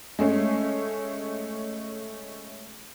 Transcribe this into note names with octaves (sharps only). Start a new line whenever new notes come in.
G#3 A3 C#4